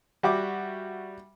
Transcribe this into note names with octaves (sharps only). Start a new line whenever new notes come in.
G3 F#4 E5 D6